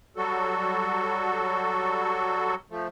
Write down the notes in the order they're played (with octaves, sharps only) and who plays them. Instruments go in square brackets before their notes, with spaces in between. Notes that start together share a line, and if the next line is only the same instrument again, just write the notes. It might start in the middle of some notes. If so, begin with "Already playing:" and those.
[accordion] F#3 G3 F#4 A4
F3 A3